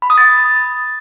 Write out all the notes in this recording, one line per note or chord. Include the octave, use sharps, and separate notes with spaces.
B5
D#6
A6